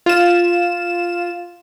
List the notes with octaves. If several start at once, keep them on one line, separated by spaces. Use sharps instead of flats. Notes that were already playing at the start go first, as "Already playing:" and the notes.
F4 E7